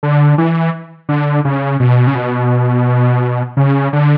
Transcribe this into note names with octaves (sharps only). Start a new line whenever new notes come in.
D3
E3
D3
C#3
B2
C#3
B2
C#3
D3